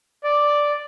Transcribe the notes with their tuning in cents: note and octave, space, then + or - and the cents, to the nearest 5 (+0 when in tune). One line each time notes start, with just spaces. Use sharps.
D5 +0